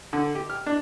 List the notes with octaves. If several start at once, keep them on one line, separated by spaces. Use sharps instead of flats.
D3
G4
F6
D4